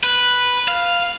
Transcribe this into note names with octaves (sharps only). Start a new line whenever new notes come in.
B4
F5